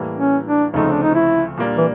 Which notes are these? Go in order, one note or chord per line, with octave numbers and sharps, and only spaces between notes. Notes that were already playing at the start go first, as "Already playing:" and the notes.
Already playing: A2 E3 G3 A#3
C#4
D4
D2 C#3 F3 A3 C4 D#4
D4
D#4
E4
A#2 G3 A#3 D4
E3